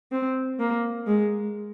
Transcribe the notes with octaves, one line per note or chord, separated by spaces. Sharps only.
C4
A#3
G#3